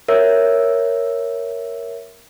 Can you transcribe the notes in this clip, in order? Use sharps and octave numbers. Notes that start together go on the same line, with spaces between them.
A#4 C#5 E5